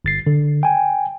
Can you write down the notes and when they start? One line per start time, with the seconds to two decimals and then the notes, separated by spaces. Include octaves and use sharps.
0.05 G1 A6 C7
0.27 D3
0.63 G5 G#5